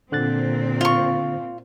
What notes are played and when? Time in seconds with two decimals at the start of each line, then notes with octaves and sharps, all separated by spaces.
0.12 A#2 D3 C4 F#6 A6
0.81 F4 C#6